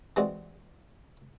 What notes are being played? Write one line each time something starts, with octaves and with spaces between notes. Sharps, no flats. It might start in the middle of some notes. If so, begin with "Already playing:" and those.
E3 G#3 C4 F#4 D5 D#5